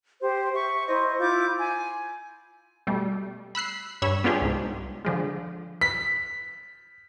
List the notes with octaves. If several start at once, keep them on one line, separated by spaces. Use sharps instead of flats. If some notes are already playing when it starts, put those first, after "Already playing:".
G4 C5
E5 C#6
E4 C5 D#5
E4 F4 D6 G6
G#5
B2 G3 A3
B5 E6 F#6 C7
G2 C#5 B5 E6
B3 C#4 D4 F4 G4 G#4
C2 G#2
D3 F3 G#3
B6